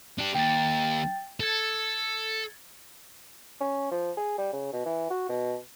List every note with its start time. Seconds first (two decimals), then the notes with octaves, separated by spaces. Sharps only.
0.19 D4 G4
0.35 D#2 G5 A6
1.40 A4 G#6 A6 C#7
3.61 C#4
3.91 F3
4.17 G#4
4.38 G3
4.53 C#3
4.73 B2
4.86 E3
5.11 F#4
5.29 B2